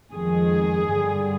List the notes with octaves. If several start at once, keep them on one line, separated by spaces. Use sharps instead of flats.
F2 D#3 G#3 G#4
G2 D3 G3